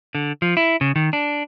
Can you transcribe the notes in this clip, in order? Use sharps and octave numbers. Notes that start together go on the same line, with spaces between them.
D3
F3
E4
C#3
D#3
D4